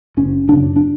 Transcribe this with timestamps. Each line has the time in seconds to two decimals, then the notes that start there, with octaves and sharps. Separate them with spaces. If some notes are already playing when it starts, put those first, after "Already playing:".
0.17 F#1 C#4
0.48 F#2 C#3 D4
0.76 D4